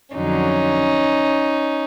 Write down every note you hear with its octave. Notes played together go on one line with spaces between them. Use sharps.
F2 D3 F#3 C#4 D#4